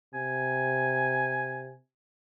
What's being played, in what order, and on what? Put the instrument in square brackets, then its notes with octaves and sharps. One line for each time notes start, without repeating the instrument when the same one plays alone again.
[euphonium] C3 [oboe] G#5